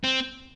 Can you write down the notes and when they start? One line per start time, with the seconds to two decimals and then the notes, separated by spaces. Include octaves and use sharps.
0.04 C4